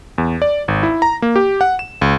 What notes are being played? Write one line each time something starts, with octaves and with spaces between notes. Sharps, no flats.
E2
D5
G#1
E4
A#5
A#3
G4
F#5
E7
C#2